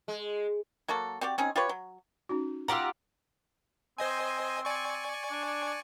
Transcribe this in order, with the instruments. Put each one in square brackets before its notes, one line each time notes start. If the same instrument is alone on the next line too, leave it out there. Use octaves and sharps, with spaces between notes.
[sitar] G#3
[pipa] F#3 A#3 F#4 A4
C4 F#4 G4 D5
C4 C#4 D#4 G#4
F4 G4 B4 C#5
F#3
[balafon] C#4 D#4 F#4
[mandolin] F4 G4 F#5 [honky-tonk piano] A#5 E6
[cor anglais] C4 [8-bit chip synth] C5 D#5 G#5
[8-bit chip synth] D5 G#5 C#6
[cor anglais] D4